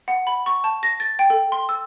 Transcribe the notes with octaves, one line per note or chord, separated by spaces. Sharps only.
F#5
B5
C#6
A5
A#6
A6
G5
A4
C6
E6